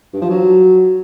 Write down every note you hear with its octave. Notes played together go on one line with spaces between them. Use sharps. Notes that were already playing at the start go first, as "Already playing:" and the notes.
G2
F3
F#3